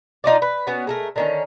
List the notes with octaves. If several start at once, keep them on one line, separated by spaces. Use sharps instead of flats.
D4 D#4 F4 D5
B4
B3 C#4 F#4
G#3 A3 A#4
D3 D#3 C#4